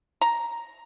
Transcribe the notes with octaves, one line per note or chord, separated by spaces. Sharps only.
A#5